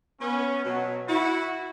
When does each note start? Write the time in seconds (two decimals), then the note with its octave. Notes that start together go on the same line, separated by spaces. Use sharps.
0.21 B3 C#4
0.65 B2 F#3
1.08 E4 F#4